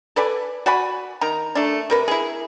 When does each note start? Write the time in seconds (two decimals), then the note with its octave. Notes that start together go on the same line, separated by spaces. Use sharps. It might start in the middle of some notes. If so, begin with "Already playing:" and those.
0.16 A4 B4 D5 G#5
0.66 F#4 D5 G#5 B5
1.21 D#3 A#5
1.55 A3 D4
1.90 C3 A#4 B4
2.08 E4 G#4